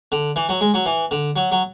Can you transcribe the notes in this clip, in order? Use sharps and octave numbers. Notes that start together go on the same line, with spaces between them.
D3
E3
F#3
G#3
F#3
E3
D3
F#3
F#3